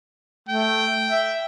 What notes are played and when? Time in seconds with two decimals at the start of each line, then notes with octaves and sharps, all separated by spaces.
0.49 A3 G5
1.11 E5